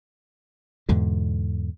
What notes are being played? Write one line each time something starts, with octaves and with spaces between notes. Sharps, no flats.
E2 G#2 B2 D3